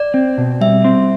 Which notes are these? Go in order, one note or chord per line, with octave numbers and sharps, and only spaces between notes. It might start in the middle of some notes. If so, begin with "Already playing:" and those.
Already playing: D5
C4
B2
G3 E5
C4